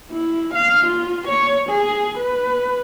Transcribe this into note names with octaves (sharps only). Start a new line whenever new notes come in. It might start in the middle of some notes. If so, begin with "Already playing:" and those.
E4
F5
F4
C#5
G#4
B4